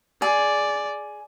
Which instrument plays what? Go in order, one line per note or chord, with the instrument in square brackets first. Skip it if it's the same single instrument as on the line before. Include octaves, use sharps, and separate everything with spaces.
[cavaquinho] G#4 [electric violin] D5